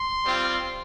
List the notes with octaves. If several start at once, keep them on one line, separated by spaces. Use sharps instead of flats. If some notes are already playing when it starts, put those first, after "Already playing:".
Already playing: C6
G3 C4 F4